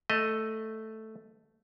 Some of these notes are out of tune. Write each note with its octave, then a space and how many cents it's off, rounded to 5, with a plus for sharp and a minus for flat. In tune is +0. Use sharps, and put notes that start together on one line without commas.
A3 +0 D#5 +0